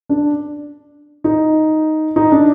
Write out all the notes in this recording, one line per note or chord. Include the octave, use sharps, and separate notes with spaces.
D4
D#4
D#4
D4